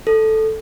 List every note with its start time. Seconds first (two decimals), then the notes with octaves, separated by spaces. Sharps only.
0.07 A4